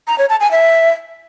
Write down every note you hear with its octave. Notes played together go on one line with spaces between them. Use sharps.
A#5
C#5
A5
G#5
E5